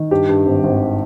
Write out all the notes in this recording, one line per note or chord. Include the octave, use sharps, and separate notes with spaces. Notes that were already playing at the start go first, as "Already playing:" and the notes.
Already playing: D#3
G2 G4
G2
G#1
G#1